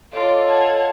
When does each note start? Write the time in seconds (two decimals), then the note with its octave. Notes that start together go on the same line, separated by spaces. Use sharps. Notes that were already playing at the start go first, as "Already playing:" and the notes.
0.13 F4 A4 C#5 D#5 C6 D6
0.45 F#5 A5 G#6